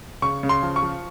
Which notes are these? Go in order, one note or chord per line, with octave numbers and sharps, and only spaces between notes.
C#3 C#6
C#3
C6
F3
C#6
F3